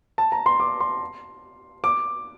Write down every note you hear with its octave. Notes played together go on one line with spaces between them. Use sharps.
A5
A#5
C6
D6
C6
D6